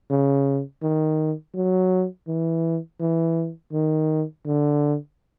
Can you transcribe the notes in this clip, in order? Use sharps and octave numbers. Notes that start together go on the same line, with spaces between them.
C#3
D#3
F#3
E3
E3
D#3
D3